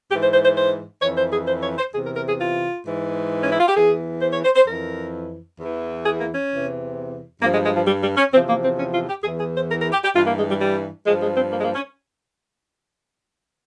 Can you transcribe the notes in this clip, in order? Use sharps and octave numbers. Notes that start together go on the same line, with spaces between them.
G#2 E3 G4
C5
C5
C5
C5
F2 E3 C#5
C5
G#4
C5
C#5
C5
E2 C3 E3 G#4
A#4
A#4
G#4
F4
G#2 E3
C#4
E4
F4
G4
E2 E3 G#4
C5
C#5
C5
C5
F2 E3 A#4
E2 E3
G#4
A#3
C#4
E2 C3 E3
G2 F3 A#3
G#3
G#3
F3
G3
G3
C#4
E2 C3 F3 C4
A#3
C4
C#4
F4
G4
E2 E3 G#4
G#4
C5
A#4
A#4
G4
G4
G2 E3 F4
A#3
G#3
G3
G3
G2 F3 G#3
G#3
C4
A#3
G#3
A#3
C#4